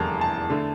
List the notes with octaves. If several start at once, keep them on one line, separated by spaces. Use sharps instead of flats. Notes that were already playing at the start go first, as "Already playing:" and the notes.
Already playing: F1 E2 D3 G3 A#3 A5 A#5
A5
D3 A3